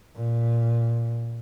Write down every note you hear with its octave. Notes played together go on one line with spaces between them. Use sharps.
A#2